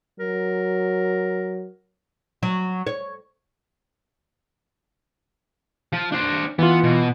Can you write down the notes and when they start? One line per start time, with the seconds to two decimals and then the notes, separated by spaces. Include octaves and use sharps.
0.20 F#3 A#4
2.43 F#3
2.87 C#5
5.93 F3 F4
6.12 D4 C5
6.59 E3 B3 F4
6.84 B2